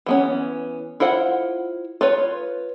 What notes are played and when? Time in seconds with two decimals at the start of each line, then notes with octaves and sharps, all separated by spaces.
0.06 E3 B3 C#4
1.00 E4 F4 C5 F#5
2.01 F4 B4 C#5